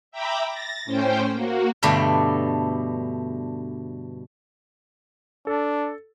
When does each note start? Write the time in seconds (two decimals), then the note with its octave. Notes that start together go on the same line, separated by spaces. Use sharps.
0.12 E5 G5 A#5 B5 D6
0.46 A6 A#6
0.85 A2 C#4 C5 G5
1.32 A#3 F#4
1.83 G2 B2 D3 A3 D4
5.47 D4 A4